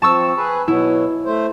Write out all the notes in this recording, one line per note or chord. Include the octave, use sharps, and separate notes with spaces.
F3 C4 A5 C#6 E6
G#4 B4
B2 F#3 B3 E4
A3 C5